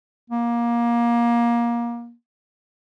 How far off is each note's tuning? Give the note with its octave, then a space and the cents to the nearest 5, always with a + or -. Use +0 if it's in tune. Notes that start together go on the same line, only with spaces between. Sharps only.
A#3 +20